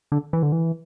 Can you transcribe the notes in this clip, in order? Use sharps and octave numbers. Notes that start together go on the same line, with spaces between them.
D3
E3
D3
E3